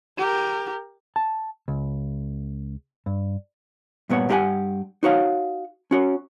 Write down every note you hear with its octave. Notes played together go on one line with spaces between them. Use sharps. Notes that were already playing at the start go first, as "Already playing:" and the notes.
G4 A#4
A5
C#2
G2
G2 A#2 B3 C#5 F#5
G2 D#4 G4 B4 F#5 G#5
D#4 F#4 C#5 F5
C#4 F#4 C#5